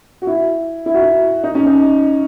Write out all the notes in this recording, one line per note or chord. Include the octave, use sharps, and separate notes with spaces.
F#4
E4
E4
F#4
E4
D#4
C#4
D#4